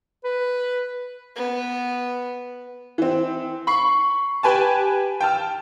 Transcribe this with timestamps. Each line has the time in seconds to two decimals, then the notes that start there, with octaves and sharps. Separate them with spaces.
0.24 B4
1.36 B3
2.98 E3 C4
3.67 B5 C#6 C7
4.43 G4 B4 G#5 A5
5.20 G5 A5 F6